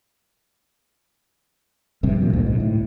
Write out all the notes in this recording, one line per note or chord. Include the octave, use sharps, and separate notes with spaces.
A#1 G2 C3
A1 F#2 A#2
D2 A#2
B1 G#2
A2